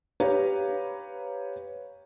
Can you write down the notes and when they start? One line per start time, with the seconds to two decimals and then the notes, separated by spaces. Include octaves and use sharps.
0.20 G4 B4 C#5 F5 A#5